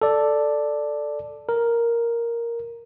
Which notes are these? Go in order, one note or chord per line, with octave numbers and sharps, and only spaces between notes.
A4 D5
A#4